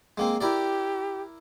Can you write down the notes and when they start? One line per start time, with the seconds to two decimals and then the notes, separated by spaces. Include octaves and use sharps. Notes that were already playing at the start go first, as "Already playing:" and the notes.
0.18 G#3 A#3 C4
0.41 E4 G4 A#4 D5